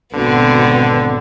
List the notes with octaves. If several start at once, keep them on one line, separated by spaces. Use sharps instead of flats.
G#1 B2 D3 B3 C4 F#4